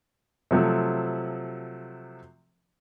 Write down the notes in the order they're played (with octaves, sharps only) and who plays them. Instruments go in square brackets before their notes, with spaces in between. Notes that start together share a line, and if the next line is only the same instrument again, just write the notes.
[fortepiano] C3 F3 F#3 A3